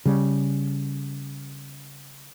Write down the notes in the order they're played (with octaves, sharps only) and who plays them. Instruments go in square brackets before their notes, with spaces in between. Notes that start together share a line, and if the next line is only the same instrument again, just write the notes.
[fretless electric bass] C#3 G3